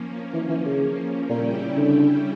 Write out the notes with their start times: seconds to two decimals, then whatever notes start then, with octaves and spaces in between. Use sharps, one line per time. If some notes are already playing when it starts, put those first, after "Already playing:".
Already playing: F3 A#3 C#4
0.33 E3
0.49 E3
0.65 C#3
1.29 A#2 C#3 G3 C#4 E4 G4
1.77 D3